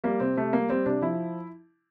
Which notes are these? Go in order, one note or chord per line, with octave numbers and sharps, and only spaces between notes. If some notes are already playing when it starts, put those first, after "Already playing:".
G3 A#3
C3 C4
C3 A3
G3 A#3
G3 C4
C3 D4
F3 E4